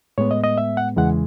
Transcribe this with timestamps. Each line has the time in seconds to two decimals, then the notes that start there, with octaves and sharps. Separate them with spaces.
0.18 A2 G#3 B3 C#5
0.31 D#5
0.44 D#5
0.58 E5
0.77 F#5
0.96 E2 C#3 E3 G#3 F#5